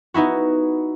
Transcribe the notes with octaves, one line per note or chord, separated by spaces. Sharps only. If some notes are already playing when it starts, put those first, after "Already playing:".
B3 D#4 E4 F#4